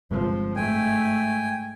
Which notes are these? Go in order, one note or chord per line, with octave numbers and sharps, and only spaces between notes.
G1 C3 F3 G#3
G#2 A3 G5 G#5